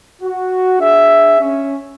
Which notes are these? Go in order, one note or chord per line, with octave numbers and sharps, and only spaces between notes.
F#4
D4 G#4 E5
C#4